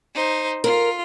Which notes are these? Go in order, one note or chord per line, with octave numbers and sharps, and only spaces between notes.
D#4 C5
F4 A#4